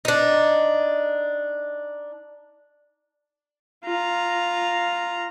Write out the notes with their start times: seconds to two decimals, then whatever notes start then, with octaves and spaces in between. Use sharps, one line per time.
0.05 D4 D#4
3.85 F4 A#5